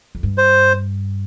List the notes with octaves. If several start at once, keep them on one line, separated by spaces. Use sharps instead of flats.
F2
G2
C5